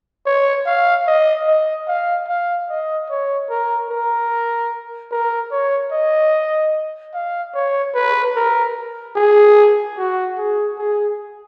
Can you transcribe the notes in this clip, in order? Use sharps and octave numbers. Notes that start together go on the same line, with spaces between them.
C#5
F5
D#5
D#5
F5
F5
D#5
C#5
A#4
A#4
A#4
C#5
D#5
F5
C#5
B4
A#4
G#4
F#4
G#4
G#4